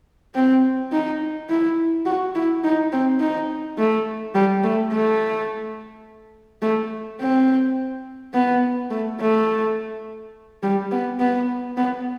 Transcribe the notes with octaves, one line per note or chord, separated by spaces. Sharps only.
C4
D#4
E4
F#4
E4
D#4
C4
D#4
A3
G3
A3
A3
A3
C4
B3
A3
A3
G3
B3
B3
B3